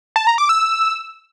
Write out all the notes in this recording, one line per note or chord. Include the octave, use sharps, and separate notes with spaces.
A5
A#5
D6
E6